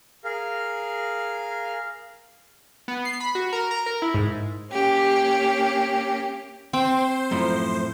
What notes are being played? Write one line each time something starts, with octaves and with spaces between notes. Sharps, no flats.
G#4 A#4 F5
B3
C7
B5
F#4
A#4
A#5
A#4
E4
G#2
A#3 C#4 G4
C4 C5 G5
F#2 A2 F3